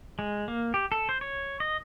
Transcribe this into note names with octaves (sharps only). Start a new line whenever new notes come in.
G#3
A#3
G4
A4
C5
C#5
D#5